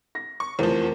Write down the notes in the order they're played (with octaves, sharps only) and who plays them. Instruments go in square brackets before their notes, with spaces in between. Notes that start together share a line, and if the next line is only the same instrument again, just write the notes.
[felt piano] A#6
[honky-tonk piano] C#6
[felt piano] F1 A#4 C5 [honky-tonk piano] E2 F3